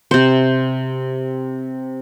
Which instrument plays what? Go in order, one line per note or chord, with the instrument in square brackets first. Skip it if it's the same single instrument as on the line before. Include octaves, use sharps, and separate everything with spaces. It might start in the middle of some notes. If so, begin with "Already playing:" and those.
[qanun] C3 C5